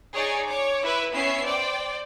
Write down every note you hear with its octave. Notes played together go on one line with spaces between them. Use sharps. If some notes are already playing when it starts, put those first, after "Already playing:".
D#4 G#4 C#5 D5 G#5
C#5 D6
E4 B4 E5
B3 C#4 E4 E5 C7
C5 D5 G5